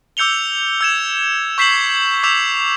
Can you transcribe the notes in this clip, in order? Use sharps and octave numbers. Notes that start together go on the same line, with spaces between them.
D6 E6 G6 C#7 F7 G7
E6 G#6 E7
C#6 G6 B6 C7 E7 F#7
D6 E6 G6 B6 E7 F7